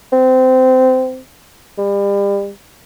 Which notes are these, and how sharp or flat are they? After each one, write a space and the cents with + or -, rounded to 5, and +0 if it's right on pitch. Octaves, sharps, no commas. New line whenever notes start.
C4 -20
G3 +35